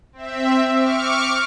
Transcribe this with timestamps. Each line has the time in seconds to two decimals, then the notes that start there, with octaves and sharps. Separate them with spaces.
0.13 C4 E5
0.77 C#6 D6 F6